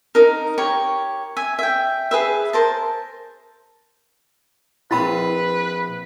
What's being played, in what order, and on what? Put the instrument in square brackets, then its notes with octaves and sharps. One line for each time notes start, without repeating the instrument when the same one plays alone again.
[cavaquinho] D#4 A#4
G4 A#4 C#5 C#6
E5 G#5
E5 G5
G#4 B4 E5
A#4 C5 A5
[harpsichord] A#1 C4 D#6 [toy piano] E4 B5 [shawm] B4